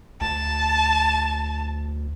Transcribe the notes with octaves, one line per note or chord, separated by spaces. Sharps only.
D2 A5